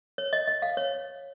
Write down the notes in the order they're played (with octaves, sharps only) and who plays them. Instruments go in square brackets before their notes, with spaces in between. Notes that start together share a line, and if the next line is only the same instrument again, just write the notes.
[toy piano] C#5
D#5
D#5
F5
C#5